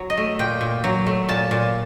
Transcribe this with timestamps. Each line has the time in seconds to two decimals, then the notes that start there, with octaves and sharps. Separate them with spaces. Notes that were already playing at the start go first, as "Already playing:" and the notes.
Already playing: F#3
0.10 D#5
0.17 A3
0.39 A#2 G5
0.61 A#2
0.84 F#3
1.06 A3
1.29 A#2 A5
1.51 A#2